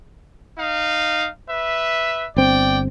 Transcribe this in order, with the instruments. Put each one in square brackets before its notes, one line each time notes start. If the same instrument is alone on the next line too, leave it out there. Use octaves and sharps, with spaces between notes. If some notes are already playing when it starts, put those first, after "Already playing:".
[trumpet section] D#4 F5
B4 E5
[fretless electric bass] G1 C4 [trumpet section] D5 G5